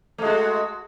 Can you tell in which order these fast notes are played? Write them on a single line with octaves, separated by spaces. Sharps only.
A3 G#3 F#4